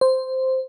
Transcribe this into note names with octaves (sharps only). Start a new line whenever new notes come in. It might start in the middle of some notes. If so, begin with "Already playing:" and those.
C5